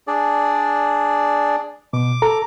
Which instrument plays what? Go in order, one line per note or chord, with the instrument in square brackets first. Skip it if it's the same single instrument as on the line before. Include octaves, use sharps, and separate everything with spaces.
[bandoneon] D4 G#4 D5
[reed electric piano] B2 [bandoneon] D6
[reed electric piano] A4 A#5